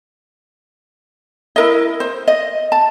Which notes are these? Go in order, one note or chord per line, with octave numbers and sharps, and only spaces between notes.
E4 A#4 D#5
C5
D#5
A5